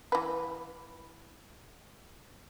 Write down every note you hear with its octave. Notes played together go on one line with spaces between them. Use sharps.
E3 B4